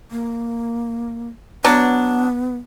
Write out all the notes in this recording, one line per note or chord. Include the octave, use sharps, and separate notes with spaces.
A#3
F#3 B3 D4